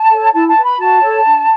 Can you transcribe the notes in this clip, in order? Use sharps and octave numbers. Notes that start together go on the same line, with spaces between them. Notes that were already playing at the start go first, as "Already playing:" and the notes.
Already playing: A5
A4 C#5
E4 A5
A5
B4
B5
F#4 A5
A4 C#5
D4